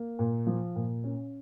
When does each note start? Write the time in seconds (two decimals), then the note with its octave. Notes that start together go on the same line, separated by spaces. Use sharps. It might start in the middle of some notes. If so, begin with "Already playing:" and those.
Already playing: A#3
0.19 A#2
0.47 F3
0.76 A#2
1.04 C#4